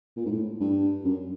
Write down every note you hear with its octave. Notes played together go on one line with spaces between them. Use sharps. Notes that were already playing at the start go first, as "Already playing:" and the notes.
A#2
G#2
A2
G2
F#2